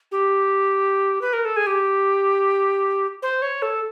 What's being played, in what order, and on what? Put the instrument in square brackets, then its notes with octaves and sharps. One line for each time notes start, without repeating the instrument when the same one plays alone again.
[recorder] G4
B4
A#4
A4
G#4
G4
C5
C#5
A4